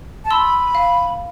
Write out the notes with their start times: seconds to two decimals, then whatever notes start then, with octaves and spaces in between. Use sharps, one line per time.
0.24 A5
0.31 B5 C6 E6
0.75 F5